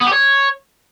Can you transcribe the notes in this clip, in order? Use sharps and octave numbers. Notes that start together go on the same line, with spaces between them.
B3
G4
C#5